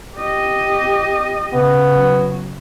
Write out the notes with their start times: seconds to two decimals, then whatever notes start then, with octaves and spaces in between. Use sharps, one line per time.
0.15 G4 D#5
1.53 C#3 B3
1.95 F#3